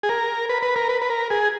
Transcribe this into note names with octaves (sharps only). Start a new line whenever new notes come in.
G#4
A#4
B4
B4
A#4
B4
B4
A#4
G#4